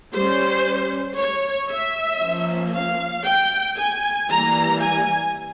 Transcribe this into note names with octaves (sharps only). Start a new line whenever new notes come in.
G3 C#4 C5
C#5
E5
F3 A#3 C#4
F5
G5
G#5
E3 G3 A#3 A#5
G#5